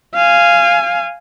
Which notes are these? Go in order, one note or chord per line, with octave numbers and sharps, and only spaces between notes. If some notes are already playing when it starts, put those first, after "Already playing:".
F5 G#5